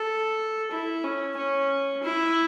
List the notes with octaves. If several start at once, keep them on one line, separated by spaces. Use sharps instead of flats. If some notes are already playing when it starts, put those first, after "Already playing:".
Already playing: A4
E4
C#4
C#4
E4